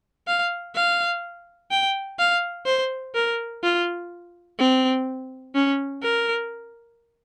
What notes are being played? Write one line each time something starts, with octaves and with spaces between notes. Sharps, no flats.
F5
F5
G5
F5
C5
A#4
F4
C4
C#4
A#4